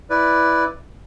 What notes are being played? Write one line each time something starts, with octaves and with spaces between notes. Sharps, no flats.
E4 B4 D5